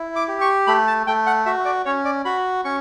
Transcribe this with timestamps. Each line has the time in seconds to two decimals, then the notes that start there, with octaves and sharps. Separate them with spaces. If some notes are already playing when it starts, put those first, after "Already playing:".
Already playing: E4
0.16 D6
0.28 G4
0.41 C#6
0.67 A3 B5
0.87 A5
1.07 A3 G5
1.26 F#5
1.46 F#4 E5
1.65 D5
1.85 C#4 C#5
2.05 D5
2.25 F#4 B5
2.65 C#4 C#6